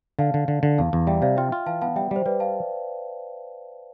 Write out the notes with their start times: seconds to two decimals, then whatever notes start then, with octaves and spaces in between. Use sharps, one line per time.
0.19 D3 F5 A5
0.34 D3
0.48 D3
0.63 D3
0.78 E2 F5 A5
0.93 E2
1.07 G3 E5 G5
1.22 C3 D5 F5
1.37 F4 E5 G5
1.52 F4
1.66 E3 F5 A5
1.81 B3 F5 A5
1.96 G3 E5 G5
2.11 G3 C5
2.26 G3 B4 D5
2.40 F5 A5